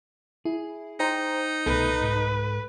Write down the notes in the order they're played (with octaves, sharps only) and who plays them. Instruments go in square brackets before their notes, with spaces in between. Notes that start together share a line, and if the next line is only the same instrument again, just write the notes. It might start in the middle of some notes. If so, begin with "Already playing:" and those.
[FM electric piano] E4 [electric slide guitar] G#4
[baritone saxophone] D#4 [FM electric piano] C5 G5 A#5
[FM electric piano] C2 A4 [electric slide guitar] B2 A3 B3 [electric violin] B4
[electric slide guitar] G#2